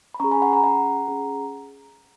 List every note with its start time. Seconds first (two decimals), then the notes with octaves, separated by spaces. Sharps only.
0.14 B5
0.20 C#4 G#4 A#5 C#6
0.31 G#5 B5
0.42 F#5 A#5
0.53 F#5 A#5
0.64 C#4 G#4 F#5 A#5
1.08 C#4 G#4